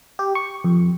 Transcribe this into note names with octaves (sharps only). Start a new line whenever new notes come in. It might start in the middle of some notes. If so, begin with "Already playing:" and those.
G4
C#6
F2